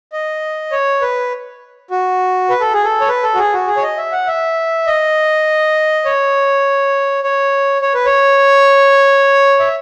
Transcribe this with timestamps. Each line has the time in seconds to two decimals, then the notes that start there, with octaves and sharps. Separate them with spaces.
0.13 D#5
0.72 C#5
1.01 B4
1.91 F#4
2.50 B4
2.61 A4
2.73 G#4
2.84 A4
3.01 C#5
3.09 B4
3.23 A4
3.34 F#4
3.38 G#4
3.53 F#4
3.67 G#4
3.77 C#5
3.82 D#5
3.98 E5
4.12 F#5
4.27 E5
4.87 D#5
6.05 C#5
7.24 C#5
7.82 C#5
7.94 B4
8.06 C#5
9.60 E5